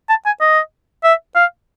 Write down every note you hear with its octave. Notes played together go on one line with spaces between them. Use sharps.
A5
G#5
D#5
E5
F5